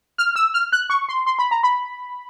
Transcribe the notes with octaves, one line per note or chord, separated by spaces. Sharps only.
F6
E6
F6
F#6
C#6
C6
C6
B5
A#5
B5